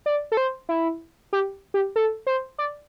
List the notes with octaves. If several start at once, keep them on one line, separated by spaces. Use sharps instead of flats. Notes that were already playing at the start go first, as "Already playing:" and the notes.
D5
A4
C5
E4
G4
G4
A4
C5
D5